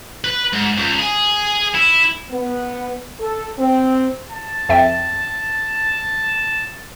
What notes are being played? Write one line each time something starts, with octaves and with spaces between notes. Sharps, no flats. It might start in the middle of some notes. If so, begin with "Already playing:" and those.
B4
G#2
C#2
G#4
E4
B3
A4
C4
A5
F2 E5 G5